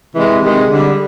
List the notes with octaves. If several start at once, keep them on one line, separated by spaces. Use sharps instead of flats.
C3 E3 G#3
C3 D#3 G#3
D3 G3